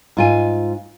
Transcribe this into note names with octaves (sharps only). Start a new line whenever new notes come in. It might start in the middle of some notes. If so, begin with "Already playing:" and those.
G#2 F4 G#5